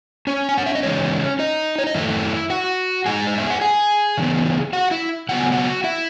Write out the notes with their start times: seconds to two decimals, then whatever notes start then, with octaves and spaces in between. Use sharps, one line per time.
0.27 C#4 C#5
0.49 G#5
0.58 F#5
0.66 E5
0.75 D#5
0.83 C#3 E3 G#3 C#4 D#4 C#5
1.39 D#4 D#5
1.78 C#5
1.87 D#5
1.95 F#2 D#3 A3 E4 E5
2.50 F#4 F#5
3.06 G#2 D#3 G#3 D#4 G#4 G#5
3.27 D#5
3.38 E5
3.50 F#5
3.61 G#4 G#5
4.17 C#3 E3 B3 D#4
4.73 F#4 F#5
4.91 E4 E5
5.29 C#3 F#3 B3 F#5
5.40 G#5
5.52 F#4 F#5
5.84 E4 E5